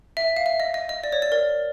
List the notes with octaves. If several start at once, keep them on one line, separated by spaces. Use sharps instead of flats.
E5
F5
E5
D#5
D#5
D#5
D5
C#5
D5
A#4